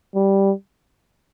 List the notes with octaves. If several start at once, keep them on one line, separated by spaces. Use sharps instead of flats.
G3